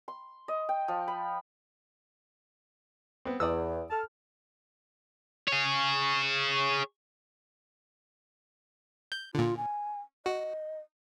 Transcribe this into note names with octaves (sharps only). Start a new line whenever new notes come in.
C6
D#5
G5
F3
B5
B3 C4
E2 D5 D#6 E6
A4 A5 F6
G#4 C#5
G6
A#2 D3 F4
G#5
F#4 D#5